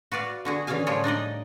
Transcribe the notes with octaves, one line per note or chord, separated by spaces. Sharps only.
F#4 B4 D5 F5
D3 F#4 G#4
D3 E3 C#4 G#4 F5 G#5
A2 F3 G3 G#4 C#5
D4 D#4 D5 D#5